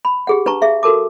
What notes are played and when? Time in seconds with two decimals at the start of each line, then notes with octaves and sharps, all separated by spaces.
0.05 B5
0.27 G4 G#4 F#5
0.46 D4 B4 A5 A#5 C#6
0.62 G#4 E5 F5
0.83 F#4 A4 A#4 A5 D6